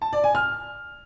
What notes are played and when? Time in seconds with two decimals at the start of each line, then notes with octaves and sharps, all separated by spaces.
0.02 A5
0.13 D5
0.24 G#5
0.35 F6